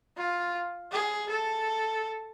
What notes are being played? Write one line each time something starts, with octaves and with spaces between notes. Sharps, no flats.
F4
G#4
A4